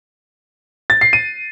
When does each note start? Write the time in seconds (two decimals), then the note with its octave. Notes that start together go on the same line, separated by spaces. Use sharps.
0.90 A6
1.01 C7
1.13 D#7